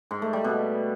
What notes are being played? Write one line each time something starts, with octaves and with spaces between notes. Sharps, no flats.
G#2
A3
G3
B2